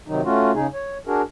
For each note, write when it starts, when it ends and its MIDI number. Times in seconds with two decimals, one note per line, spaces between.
0.08 0.22 48
0.08 0.22 51
0.08 0.22 54
0.08 0.22 63
0.25 0.52 57
0.25 0.52 61
0.25 0.52 65
0.25 0.52 66
0.55 0.67 49
0.55 0.67 63
0.55 0.67 68
0.74 0.98 73
1.07 1.22 62
1.07 1.22 66
1.07 1.22 68
1.07 1.22 70